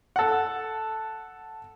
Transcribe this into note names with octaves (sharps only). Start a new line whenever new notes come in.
A4 F#5